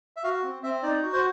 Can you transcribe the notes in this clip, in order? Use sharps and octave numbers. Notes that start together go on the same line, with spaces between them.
E5
F#4 F5
C4
C4 E5
D#4 D5
F#4
C5